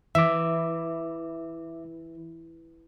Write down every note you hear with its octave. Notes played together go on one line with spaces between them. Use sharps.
E3 E5 D6